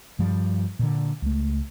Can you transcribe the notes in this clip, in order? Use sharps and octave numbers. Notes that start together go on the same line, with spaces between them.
G2 F3 G3
A#2 D3
C#2 A3